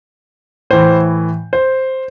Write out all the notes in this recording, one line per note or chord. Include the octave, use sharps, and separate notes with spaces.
A2 E3 C5
C5